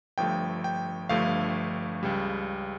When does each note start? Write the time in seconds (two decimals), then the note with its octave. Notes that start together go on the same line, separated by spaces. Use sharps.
0.18 G1 G2 F3 A3 G5
0.64 G5
1.09 G1 G2 F3 A3 F5
2.03 C#2 C#3 G3